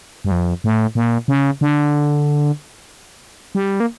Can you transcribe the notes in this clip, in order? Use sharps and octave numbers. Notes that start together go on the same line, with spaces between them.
G2
F2
A2
A#2
C#3
D3
G3
A#3